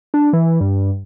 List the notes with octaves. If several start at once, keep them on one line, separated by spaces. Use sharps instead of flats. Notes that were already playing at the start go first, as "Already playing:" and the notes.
D4
E3
G2